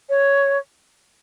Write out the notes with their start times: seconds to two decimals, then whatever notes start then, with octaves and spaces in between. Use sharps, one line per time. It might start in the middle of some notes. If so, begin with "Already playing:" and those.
0.10 C#5